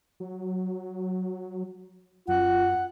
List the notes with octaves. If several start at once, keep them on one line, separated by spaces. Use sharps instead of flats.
F#3
F#2 F4 F#5